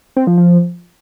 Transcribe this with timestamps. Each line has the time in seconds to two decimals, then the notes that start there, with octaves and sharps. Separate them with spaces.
0.16 C4
0.27 F3
0.37 F3